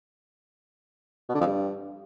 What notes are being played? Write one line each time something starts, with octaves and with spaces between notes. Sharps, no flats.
B2
D3
F2
G2